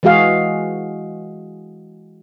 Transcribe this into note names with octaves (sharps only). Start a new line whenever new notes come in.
E3 G#3 F#4 G#4 F5